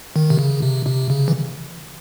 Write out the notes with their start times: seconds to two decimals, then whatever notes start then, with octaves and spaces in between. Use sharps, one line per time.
0.16 D#3
0.30 C3
0.39 C#3
0.62 C3
0.86 C3
1.10 C#3
1.28 E3